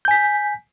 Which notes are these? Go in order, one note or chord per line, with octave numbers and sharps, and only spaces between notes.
G#5 G6 B6